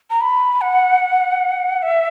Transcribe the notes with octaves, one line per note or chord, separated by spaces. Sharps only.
A#5
B5
F#5
E5